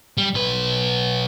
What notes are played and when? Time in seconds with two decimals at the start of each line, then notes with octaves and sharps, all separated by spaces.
0.18 G3
0.34 B1 B4